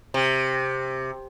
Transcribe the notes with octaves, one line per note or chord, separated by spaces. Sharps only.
C3